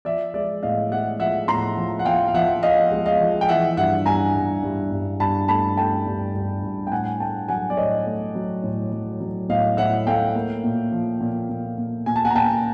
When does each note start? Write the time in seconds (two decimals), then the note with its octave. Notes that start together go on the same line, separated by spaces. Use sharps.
0.05 F3 D5 E5
0.34 G#3 D5 E5
0.63 A2 D#5 F5
0.91 G#3 E5 F#5
1.20 F3 E5 F#5
1.48 A2 A#5 C6
1.77 F3
1.99 F#5
2.05 F3 F5 G5
2.28 F5
2.34 F3 E5 F#5
2.63 F3 D#5 F5
2.92 G#3
3.06 D#5 F5
3.20 F3
3.41 G5
3.49 E3 E5 F#5
3.77 G2 E5 F#5
4.06 G2 G#5 A#5
4.35 G2
4.63 G2
4.92 G2
5.20 G2 A5 B5
5.48 A3 A5 B5
5.77 A3 G5 A5
6.06 G2
6.35 G2
6.64 G2
6.87 G5
6.92 A2 F#5 G#5
7.20 A3 G5 A5
7.48 F#3 F#5 G#5
7.70 D5
7.77 A2 C#5 D#5
8.06 A3
8.35 F#3
8.63 A2
8.92 F#3
9.20 F#3
9.49 A2 D#5 F5
9.77 A2 E5 F#5
10.07 A3 F5 G5
10.35 A#3
10.64 A#2
10.92 F3
11.21 A#2
11.49 A#2
11.78 A#2
12.06 A#2 G#5
12.16 A5
12.25 F#5 G#5
12.30 A#5
12.35 A#2 G5 A5